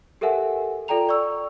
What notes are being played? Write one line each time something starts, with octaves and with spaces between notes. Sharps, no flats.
G4 A4 A#4 E5 F#5 G#5
F4 A4 D5 G5 A#5 F7
D5 C#6 E6